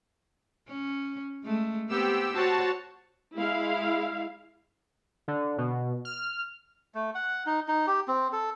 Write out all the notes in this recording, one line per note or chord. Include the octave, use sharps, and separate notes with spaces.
C#4
G#3 A3
B3 C4 G4 E6
F#4 C5 C#5 A5
G#3 E4 F5
D3
B2
F6
A3
F#5
D#4
D#4
G4
C4
A4